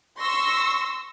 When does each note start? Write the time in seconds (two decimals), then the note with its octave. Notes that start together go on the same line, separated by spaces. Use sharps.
0.20 C6 C#6 E6 A#6